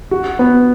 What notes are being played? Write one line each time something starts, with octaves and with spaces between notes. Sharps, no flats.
F#4
B3